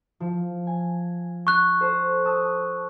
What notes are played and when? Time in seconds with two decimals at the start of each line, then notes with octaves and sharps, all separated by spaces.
0.20 F3
0.67 G#5
1.47 C#6 F#6
1.80 A4 C5
2.25 A5 D#6 E6